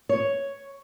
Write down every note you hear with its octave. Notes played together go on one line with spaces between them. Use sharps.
C#5